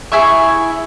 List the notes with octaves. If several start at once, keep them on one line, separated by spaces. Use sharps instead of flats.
E4 G#4 E5 C#6